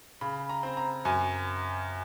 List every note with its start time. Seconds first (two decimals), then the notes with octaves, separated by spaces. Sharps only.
0.21 C#3 B5
0.49 A#5
0.63 C4
0.77 A#5
1.05 F#2 G#5